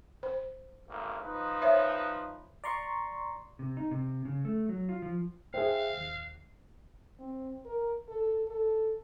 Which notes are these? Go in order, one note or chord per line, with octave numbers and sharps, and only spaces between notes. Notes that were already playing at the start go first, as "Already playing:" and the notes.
C5
G#1 D2 A#3
F3 D#4 B4
C5 C#5 E5
D5 A#5 C6 C#6
C3
D#4
C3
C#3
A3
F#3
F4
F3
G#4 C5 E5 F5 G5
D#2
C4
A#4
A4
A4